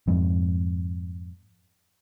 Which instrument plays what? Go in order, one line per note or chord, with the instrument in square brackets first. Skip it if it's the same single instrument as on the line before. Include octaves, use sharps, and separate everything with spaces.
[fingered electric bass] F2 G#2